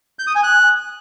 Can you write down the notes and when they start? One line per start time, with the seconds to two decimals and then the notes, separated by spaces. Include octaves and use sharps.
0.19 G6
0.27 D#6
0.35 G#5
0.43 F#6